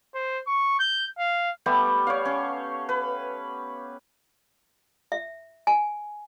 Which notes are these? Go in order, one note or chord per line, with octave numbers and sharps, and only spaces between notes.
C5
C#6
G6
F5
G3 A3 B3 G4
C#5 D5 F5
C#4
B4
E5
G#5